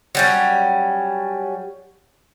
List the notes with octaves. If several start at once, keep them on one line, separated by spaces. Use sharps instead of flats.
F#3 G3 C#4